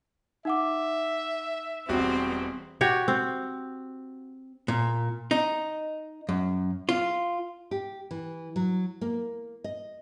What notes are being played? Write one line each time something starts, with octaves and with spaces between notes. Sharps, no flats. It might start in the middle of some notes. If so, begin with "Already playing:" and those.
D#4 E5 F#5 D6
E1 G3 C4 F#4
F#4 G4 C#5
C4
A#2
D#4
F#2
F4
G4
E3
F#3
A#3
D#5